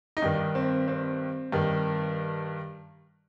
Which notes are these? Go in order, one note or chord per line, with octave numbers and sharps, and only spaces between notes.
D#4
G2 D#3 D4
C4
C4
G2 D#3